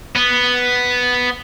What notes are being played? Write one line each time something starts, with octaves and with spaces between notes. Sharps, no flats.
B3